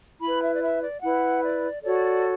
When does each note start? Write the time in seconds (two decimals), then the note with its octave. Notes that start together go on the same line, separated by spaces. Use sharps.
0.21 E4 B4 B5
0.42 E5
0.54 D5
0.62 E5
0.82 D5
1.02 E4 B4 F#5
1.42 D5
1.83 F#4 A4 C#5 D5